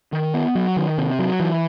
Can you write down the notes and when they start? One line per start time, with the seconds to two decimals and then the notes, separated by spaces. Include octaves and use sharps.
0.13 D#3
0.34 B3
0.55 F#3
0.77 D#3
0.98 C3
1.19 F#3
1.40 E3